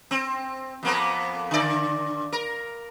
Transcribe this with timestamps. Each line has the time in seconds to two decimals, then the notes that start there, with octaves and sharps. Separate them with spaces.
0.11 C4
0.83 F2 A#3 B3
1.51 D3 D5
2.32 A#4